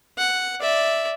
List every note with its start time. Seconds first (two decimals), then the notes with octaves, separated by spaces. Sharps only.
0.18 F#5
0.60 D5 E5